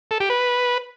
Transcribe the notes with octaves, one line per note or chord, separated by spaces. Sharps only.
A4
G4
B4